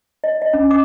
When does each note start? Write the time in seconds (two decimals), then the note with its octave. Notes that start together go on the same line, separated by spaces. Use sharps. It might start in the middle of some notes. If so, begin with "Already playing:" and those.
0.24 D#5
0.42 D#5
0.53 C#4
0.71 D6